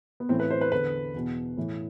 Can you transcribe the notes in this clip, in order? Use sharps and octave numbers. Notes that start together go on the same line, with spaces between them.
B3
A2 E3 C4
B4
C5
B4
E2 D3 B4
E2 B2
A2 E3